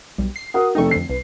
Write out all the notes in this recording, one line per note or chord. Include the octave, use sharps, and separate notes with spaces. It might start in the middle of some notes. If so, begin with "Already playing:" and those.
B1 G3
C7
F#4 A#4 F#5 D#6
F1 A3 D#4 A4 G5 C#6
F2 D3 C7
C2 B4